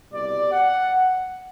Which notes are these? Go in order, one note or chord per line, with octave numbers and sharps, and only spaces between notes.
C2 B2 G3 D5
F#5